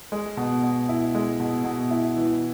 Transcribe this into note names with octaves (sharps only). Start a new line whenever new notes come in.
G#3
B2
B2
E4
G#3
B2
B2
E4
E3